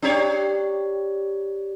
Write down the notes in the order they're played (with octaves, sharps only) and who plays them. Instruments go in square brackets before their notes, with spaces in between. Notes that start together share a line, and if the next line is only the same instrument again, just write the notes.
[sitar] D4 G4 C#5